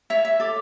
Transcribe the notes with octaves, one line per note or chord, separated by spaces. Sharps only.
C#5 E5
E5
A4 D6